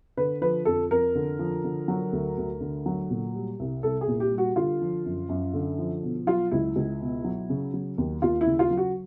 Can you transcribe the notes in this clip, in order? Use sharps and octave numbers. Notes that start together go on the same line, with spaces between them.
D3 B4
F3 B4
F2 A4
F2 A#4
D3
F3
D3
F#3
D2
D2
D3
F#3
A#2
G3
C2
C2 A4
G#4
A#2
G4
G3
F#4
D3 F4
F3
F#2
F#2
D3
F3
B2
F#3 F4
C#2 E4
C#2
B2
F#3
C#3
F#3
D#2
D#2 F4
E4
C#3
F4
F#3
F#4